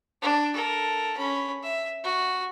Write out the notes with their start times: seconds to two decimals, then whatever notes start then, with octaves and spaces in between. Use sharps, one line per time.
0.22 D4
0.54 A4 A#4
1.17 C#4 B5
1.63 E5
2.04 F#4